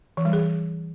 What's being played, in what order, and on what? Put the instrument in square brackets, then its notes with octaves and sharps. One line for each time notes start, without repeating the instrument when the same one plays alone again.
[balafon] E3
G3
G#4